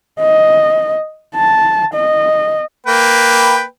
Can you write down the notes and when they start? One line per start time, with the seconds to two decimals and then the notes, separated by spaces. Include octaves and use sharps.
0.20 D#5
1.36 A5
1.94 D#5
2.87 A#3 B4 G5